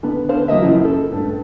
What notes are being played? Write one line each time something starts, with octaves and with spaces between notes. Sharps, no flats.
D3 B3
D3 C5 F5
F#3 A#3 D#5 E5
F#2 C#3 E3 F3
A4
G2 A3